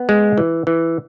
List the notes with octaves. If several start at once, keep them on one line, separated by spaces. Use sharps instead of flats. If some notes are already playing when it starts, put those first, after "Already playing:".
Already playing: B3
G#3
E3
E3